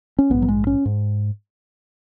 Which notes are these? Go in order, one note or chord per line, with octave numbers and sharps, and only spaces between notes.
C#4
A#1 G#2 B3
F#3
G#3
C#4
G#2